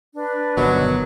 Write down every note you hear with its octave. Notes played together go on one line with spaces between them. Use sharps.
D4 B4
G1 B2 D#3 F#3